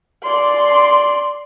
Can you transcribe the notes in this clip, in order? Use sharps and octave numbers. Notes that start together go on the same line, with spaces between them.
D5 C6